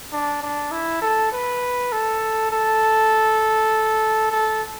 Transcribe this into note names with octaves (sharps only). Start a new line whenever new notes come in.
D4
D4
E4
A4
B4
A4
A4
A4